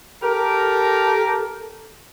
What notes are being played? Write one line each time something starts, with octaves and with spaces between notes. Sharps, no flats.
G4 A4 A#4